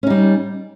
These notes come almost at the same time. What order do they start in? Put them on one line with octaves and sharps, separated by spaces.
C#4 D#4 G3